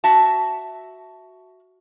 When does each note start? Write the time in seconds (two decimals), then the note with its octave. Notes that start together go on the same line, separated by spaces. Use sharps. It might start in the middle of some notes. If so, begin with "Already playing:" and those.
0.04 F#4 E5 A5